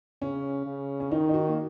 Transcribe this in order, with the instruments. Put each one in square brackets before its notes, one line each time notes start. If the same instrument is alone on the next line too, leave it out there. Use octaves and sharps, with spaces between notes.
[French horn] C#3 [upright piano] C#4
[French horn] C#3
[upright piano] C#4
[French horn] D#3 [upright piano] D#4
[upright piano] D#4
F#4
A#3